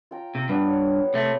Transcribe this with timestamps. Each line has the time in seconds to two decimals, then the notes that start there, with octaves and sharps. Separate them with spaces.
0.11 F4 G5 A#5
0.35 C3
0.49 G2 B3 D5
0.66 C#5
1.14 C3 A3